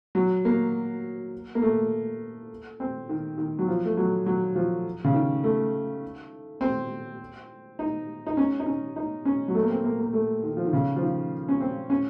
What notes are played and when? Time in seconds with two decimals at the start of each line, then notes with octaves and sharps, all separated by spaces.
0.15 F#3
0.45 A#3
1.55 A#3
1.62 A3
2.80 C4
3.09 D#3
3.38 D#3
3.59 F#3
3.68 F3
3.85 A3
3.97 F#3
4.26 F#3
4.55 F3
5.04 C#3
5.14 D#3
5.44 A3
6.61 C4
7.79 D#4
8.27 D#4
8.37 C#4
8.60 D#4
8.66 C#4
8.96 D#4
9.25 C#4
9.48 F#3
9.55 A3
9.63 A#3
9.70 C4
9.84 A#3
9.99 A#3
10.13 A3
10.43 D#3
10.57 F3
10.65 D#3
10.73 C#3
10.96 F3
11.02 D#3
11.49 C#4
11.60 C4
11.90 C#4